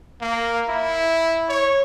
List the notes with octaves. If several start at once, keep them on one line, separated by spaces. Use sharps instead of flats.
A#3
E4
C#5